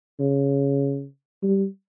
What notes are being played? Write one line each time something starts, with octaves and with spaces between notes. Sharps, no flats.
C#3
G3